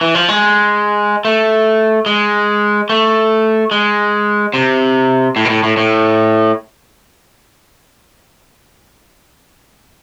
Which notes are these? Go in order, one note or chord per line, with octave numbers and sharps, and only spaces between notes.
E3
F3
G#3
A3
G#3
A3
G#3
C3
A2
B2
A2
A2
A2